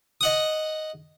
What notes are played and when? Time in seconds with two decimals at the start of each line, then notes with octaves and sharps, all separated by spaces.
0.21 D#5 F#5 D#6